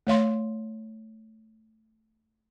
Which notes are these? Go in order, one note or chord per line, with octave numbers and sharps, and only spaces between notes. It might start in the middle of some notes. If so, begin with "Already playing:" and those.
A3 C#5 F5 C6